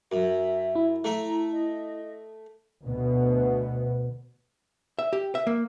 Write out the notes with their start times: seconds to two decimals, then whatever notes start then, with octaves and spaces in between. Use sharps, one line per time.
0.12 F#2 E5
0.75 E4
1.04 A3 E5 A#5
1.52 D#5
2.84 D2 B2 B3
4.99 E5
5.13 G4
5.35 E5
5.47 A#3